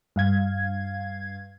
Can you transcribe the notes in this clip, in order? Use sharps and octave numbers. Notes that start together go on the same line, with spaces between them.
G2 F5 G#6